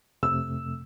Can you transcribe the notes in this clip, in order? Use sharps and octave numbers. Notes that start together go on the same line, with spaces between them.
F2 C3 A3 E6